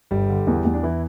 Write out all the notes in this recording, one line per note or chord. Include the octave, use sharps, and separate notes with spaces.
G1 G3 G4
D3
E2
E2
D4
E3 E4